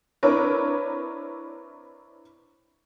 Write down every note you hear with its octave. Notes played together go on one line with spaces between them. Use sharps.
C4 D4 E4 A#4 B4 C#5